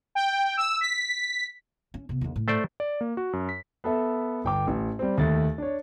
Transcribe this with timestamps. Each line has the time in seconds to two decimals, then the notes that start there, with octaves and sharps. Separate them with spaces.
0.15 G5
0.57 E6
0.81 B6
1.94 C#4
2.09 C3 B3
2.21 D#2 D3
2.36 A2
2.48 A3 C5 D5
2.80 D5
3.01 A#3
3.17 F#4
3.33 F#2
3.49 B6
3.84 B3 A4 E5
4.44 G1 G5 D6
4.67 A1
4.99 G3 C4
5.18 D#2 A3 A6
5.58 D4 C#5